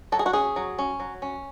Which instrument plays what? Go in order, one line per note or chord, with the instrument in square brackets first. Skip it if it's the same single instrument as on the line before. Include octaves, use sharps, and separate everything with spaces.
[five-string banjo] F#3 A4
G#4
F#4
C#4 G#4
F#3
C#4
F#3
C#4